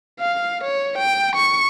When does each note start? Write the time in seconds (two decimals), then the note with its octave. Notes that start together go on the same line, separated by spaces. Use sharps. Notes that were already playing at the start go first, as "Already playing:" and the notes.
0.20 F5
0.64 C#5
0.98 G5
1.35 C#6